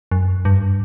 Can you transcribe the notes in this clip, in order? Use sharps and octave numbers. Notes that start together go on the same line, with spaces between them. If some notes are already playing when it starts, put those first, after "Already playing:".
F#2
G2